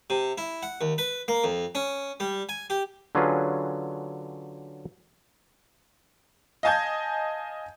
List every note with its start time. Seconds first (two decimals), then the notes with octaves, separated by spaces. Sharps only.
0.10 C3
0.38 E4
0.63 F#5
0.81 D#2
0.98 B4
1.28 A#3
1.44 F2
1.75 C#4
2.20 G3
2.49 G#5
2.70 G4
3.15 D3 F#3 C#4 F4 G#4 B4
6.63 D#5 F5 G#5 A5 G6 G#6